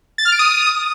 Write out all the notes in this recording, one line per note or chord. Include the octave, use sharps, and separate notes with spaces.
A6
F6
D7
D#6